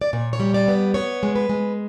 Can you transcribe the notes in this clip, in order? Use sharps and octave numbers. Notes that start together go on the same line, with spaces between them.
D5
A#2 C#5
C#5
G3
D5
B3
B3 C#5
G#3
B4
G#3